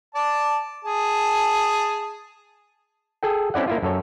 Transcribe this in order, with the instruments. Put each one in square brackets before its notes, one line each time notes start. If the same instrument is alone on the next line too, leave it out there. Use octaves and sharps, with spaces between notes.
[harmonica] D5 A5
G#4 A5
[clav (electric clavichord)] G#4 A4 G5
C4 C#4 E4 D5 F#5
A#3 E4 F4
F#2 A4 C#5